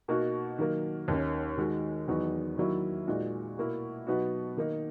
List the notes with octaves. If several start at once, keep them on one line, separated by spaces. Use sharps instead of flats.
B2 A#3 D#4 F#4
D#3 F#3 A#3
D#2 D#3 A#3 C#4
D#3 G#3 D#4 F#4
E2 D#3 F#3 B3 D#4
D#3 F#3 A#3 E4
A#2 G#3 D#4 F#4
B2 A#3 E4
B2 F#3 B3 D#4 F#4
D#3 A#3 D#4